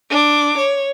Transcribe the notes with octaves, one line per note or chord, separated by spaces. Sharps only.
D4 D6
C#5